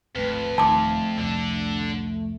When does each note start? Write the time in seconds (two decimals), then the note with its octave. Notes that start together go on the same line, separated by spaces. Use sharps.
0.15 D1 G#1 F2 A3 B4
0.58 D#1 D#3 A3 A5 C6 D6
1.18 C2 F2 D3 D4